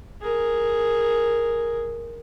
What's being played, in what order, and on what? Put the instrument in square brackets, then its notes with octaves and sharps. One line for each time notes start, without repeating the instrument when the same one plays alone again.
[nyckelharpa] G#4 A#4